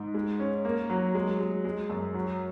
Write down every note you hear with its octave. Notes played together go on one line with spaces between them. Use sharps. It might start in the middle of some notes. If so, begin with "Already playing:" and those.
Already playing: G#2
G#3
C#4
A#3
F#3
G#3
G#3
G#3
F#2
F#3